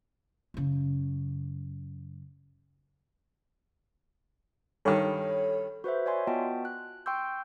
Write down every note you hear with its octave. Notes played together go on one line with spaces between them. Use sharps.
F#2 C#3
G2 D#3 A4 C#5 B5
F#4 B4 C5 E5
C#5 D5 E5 G#5 C6
B3 F4 F#4 D#5 G5 A5
F#6
G5 C6 C#6 E6 G6